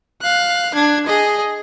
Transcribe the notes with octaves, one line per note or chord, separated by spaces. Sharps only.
F5 F#6
D4 G#6
G#4 D#5